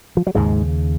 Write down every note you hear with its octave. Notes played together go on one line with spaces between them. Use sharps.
F3
F#3
D#2 G#2 C#3 G#3